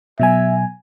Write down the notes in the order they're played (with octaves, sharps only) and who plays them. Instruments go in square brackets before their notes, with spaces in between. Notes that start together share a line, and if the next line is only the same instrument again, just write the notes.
[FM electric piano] B2 F#3 G#5 [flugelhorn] E5